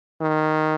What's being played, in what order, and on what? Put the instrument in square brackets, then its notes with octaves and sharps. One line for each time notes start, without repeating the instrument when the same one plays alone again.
[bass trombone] D#3